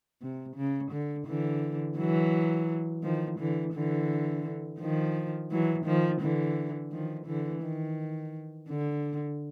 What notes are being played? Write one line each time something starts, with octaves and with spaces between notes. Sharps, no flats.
C3
C#3
D3
D3 E3
E3 F#3
D#3 F3
D3 E3
D3 E3
D#3 F3
E3 F#3
D#3 F3
D3 E3
D#3 F3
D3 E3
D#3
D3